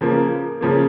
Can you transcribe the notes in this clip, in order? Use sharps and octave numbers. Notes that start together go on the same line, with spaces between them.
C#3 F3 A#3
C#3 F3 A#3